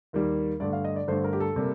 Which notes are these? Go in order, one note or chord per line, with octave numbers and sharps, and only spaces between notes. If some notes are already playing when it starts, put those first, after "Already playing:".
D#2 D#3 G3 A#3
G2 D3 A3 D5
F5
D#5
D5
G2 D3 A3 C5
A#4
G4
A4
C3 G3 A#3